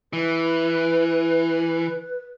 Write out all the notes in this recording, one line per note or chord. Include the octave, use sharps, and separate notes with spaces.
E3 B4